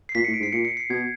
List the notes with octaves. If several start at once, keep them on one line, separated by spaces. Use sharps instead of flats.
C7
A#2 B6
C#7
A2
D7
G#2
C7
A#2 C#7
C#7
C7
B2 G#6